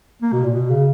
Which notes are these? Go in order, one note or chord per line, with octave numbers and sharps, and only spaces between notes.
A#3
B2
A#2
B2
C#3